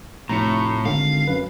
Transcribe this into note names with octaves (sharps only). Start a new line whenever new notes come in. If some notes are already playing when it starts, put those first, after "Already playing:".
F1 A2 A#5 C#7
G#1 D3 F5
F#2 B4